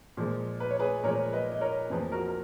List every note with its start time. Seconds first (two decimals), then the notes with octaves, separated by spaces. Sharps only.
0.17 A#2 F3 G#3
0.60 B4
0.70 C#5
0.79 G#4 B4
1.03 A#2 F3 G#3 A#4 C#5
1.33 B4 D#5
1.52 D#5
1.61 A#4 C#5
1.90 F2 F3 A#3 G#4 B4
2.12 F#4 A#4
2.27 A#4